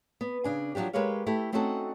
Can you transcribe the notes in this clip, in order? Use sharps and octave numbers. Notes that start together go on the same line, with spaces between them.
B3
C#3 D4 G#5
F3 F#3 A3 D4 G4
G#3 G4 A#4 B4 C#5 F5
A3 E4 G4 A4
A3 C4 C#4 D#4 F#4 A4